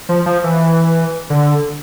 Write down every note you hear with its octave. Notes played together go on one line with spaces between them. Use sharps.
F3
F3
E3
D3